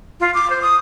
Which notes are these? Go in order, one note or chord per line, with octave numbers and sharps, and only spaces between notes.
F4
D6
C5
D#6